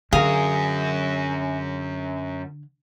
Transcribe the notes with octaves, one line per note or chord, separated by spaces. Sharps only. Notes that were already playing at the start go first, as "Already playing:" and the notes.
F#2 D3 F#4 G#4 A#4 F5